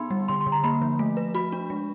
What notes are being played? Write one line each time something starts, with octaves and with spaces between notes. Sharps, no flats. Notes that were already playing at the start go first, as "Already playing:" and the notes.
Already playing: D3 B3 D#4 B5 C6
G3
D3 C6
C6
D3
A#5
A#3 B5
F3
A3
B4
F#4 B5
D4
G#3